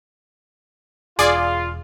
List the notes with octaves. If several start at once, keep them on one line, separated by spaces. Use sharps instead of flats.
E1 F4 G#4 D5 C7